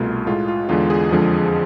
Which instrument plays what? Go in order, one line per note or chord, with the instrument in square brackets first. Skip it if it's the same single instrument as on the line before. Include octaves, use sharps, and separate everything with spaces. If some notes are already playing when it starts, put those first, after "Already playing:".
Already playing: [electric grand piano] C2 B2 A3 F4
A2 G#3 F4
F4
E2 D3 G#3 F4
G#4
F2 D3 F3 G#3